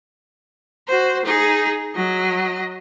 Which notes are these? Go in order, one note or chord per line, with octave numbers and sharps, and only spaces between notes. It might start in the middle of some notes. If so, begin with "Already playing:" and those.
F#4 C5
D#4 G#4
F#3 D#5